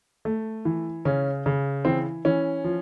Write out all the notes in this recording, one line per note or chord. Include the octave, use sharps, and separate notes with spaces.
A3
E3
C#3 C#4
C#3
E3 C4
E3 C#4
F3